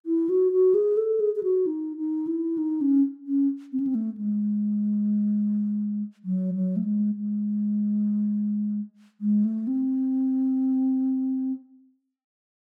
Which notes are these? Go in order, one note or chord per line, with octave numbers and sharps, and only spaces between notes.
E4
F#4
F#4
G#4
A4
G#4
G#4
F#4
D#4
D#4
E4
D#4
C#4
C#4
C4
C#4
C4
A3
G#3
F#3
F#3
A3
G#3
G#3
G#3
A3
C4